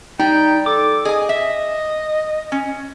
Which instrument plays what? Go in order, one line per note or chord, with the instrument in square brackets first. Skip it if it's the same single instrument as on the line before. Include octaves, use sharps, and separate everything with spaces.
[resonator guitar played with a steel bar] G3 [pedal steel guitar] D#4 [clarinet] G5
[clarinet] A4 [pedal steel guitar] D6
[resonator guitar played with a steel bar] G#4 G#5 [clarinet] D#5
[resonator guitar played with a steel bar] E5
C#4